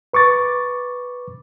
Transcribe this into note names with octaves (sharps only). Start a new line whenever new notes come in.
B4 C#6 D6 A6